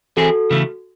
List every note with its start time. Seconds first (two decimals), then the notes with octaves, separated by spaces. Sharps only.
0.17 E3 C4 E4 F#4 G#4 A4
0.51 C#3 E3 A3